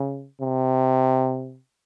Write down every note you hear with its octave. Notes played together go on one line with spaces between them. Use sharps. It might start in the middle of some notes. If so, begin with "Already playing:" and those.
Already playing: C#3
C3